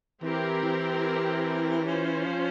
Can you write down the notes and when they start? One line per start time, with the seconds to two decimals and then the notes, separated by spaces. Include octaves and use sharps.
0.23 E3 C4 E4 G4 A#4
0.64 E3
1.86 C#4 F4 C5
2.26 F3